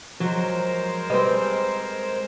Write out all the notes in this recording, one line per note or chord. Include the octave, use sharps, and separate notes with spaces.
F3 F#3 G#3 A#4 C5
G3 C4 B4 D#5